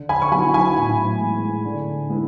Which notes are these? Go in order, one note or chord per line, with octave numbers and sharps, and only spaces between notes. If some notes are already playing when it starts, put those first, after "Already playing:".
Already playing: D3
G#5 B5
C#6
F#3 B3 E4 G#5 B5
G#5 B5
A2
E3 G#3 B3
D3
G#3 B3 E4